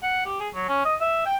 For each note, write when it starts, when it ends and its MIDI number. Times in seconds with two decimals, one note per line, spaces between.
0.03 0.26 78
0.26 0.36 67
0.40 0.49 68
0.54 0.68 54
0.69 0.84 61
0.85 0.95 75
1.01 1.24 76
1.26 1.36 79